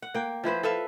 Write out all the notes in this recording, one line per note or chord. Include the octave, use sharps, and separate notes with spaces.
F#5
A#3 G5
F3 E4 B4 C5
A4 B4 E5 F5